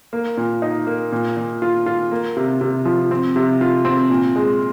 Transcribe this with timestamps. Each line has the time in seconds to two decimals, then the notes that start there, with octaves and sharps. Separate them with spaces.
0.13 A#3
0.37 A#2
0.62 D#4
0.87 A#3
1.12 A#2
1.37 A#2
1.62 F4
1.86 F4
2.11 A#3
2.37 C3
2.61 C3
2.85 F3
3.11 C4
3.36 C3
3.61 F4
3.85 C4
4.10 A#2
4.36 G#3